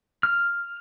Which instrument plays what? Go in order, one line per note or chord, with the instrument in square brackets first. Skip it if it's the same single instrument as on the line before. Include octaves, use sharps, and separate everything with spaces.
[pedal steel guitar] F6